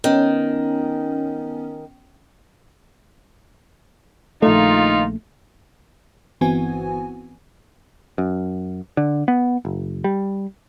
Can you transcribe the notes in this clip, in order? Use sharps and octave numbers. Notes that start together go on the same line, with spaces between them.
D#3 B3 C#4
A#1 D#3 A3 D#4 F4
G1 E3 B3 C4 F#4 G#5
F#2
D3
B3
F#1
G3